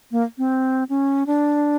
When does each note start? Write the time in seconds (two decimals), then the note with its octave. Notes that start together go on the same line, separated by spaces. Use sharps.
0.12 A#3
0.38 C4
0.89 C#4
1.27 D4